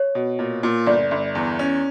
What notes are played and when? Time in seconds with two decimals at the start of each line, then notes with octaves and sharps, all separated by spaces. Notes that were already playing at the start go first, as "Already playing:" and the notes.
Already playing: C#5
0.15 B2
0.39 A#2
0.63 A#2
0.87 G1 D5
1.11 G1
1.35 E2
1.59 C#4